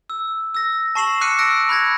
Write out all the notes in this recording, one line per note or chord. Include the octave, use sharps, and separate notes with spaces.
E6
E6 A#6
A5 C#6 C7 E7 F#7
D6 F6 F#6 C7 C#7 D#7
E6 F#6 A#6 D7
B5 F#6 G#6 A#6